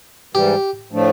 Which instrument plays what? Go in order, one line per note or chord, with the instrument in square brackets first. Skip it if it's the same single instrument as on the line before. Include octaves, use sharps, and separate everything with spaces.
[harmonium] G#2 E3 G3 [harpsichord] G4
[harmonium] A2 F3 A3 D4